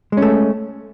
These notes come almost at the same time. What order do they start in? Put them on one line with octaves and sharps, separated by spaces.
G#3 C#4 A3